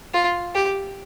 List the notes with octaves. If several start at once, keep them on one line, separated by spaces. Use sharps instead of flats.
F4
G4